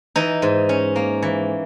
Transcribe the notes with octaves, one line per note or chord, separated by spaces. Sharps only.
E3 D#4
G#2
C#4
A#3
E3